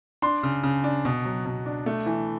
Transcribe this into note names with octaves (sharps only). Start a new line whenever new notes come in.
D4 C6
C#3
C#3
D4
B2
F#3
B2
D4
A3
E3